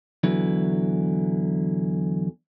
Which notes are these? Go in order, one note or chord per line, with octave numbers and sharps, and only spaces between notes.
E2 D3 F#3 E4 B4